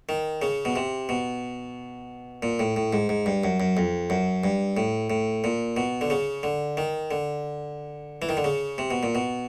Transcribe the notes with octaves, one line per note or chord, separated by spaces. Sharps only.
D#3
C#3
B2
C3
B2
A#2
A2
A2
G#2
G#2
G2
F#2
F#2
F2
F#2
G2
A2
A2
A#2
B2
D3
C#3
D3
D#3
D3
E3
D#3
D3
C#3
C3
B2
A#2
B2